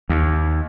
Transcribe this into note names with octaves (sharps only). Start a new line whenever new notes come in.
D#2